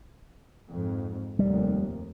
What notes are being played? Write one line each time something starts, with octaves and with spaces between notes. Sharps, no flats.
F2 G#2
F1 D#2 G3